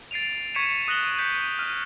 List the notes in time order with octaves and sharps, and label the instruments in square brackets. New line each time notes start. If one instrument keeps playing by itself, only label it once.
[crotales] A6 C7 D7 D#7 F7
C#6 G#6 B6 C#7 D#7 E7
D#6 F#6 A#6 F#7 G7
G6 B6 C#7
F6